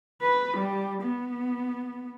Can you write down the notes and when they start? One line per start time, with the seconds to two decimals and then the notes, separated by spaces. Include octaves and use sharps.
0.22 B4
0.57 G3
1.01 B3